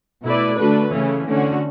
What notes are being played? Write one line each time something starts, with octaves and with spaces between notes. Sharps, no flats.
B2 A3 E4 B4 D5
D3 A3 D4 F#4 B4
C#3 E3 A3 C#4
D3 A3 C#4 F#4